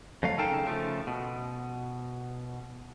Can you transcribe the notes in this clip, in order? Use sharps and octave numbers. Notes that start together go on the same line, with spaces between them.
F2 F#3 A3 F5
C#3 D#4 A4 A#4 G5 A5
C#3 F3 A3
B2